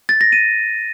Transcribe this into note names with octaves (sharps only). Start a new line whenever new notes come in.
A6
A#6
D#7